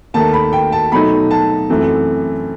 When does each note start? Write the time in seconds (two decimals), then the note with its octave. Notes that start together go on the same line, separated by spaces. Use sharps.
0.14 D#2 D#3 A3 A5
0.33 B5
0.53 G5
0.72 A5
0.92 B2 F#3 A3 D#4 B5
1.31 A5
1.70 F#2 E3 A3 C4